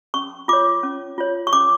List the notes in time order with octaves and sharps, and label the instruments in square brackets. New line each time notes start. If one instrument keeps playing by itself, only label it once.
[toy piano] C#4 C#6
F4 C#5 D6
C#4
F4 C#5
C#6
C#4 D6